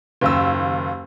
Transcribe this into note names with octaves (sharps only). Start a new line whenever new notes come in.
F#1 D#2 E6